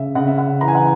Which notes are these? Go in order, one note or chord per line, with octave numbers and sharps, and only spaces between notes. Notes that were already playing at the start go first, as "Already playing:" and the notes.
Already playing: C#3 E5
C#3 F#5
E5
F#5
E3 A#5
G#5
F#5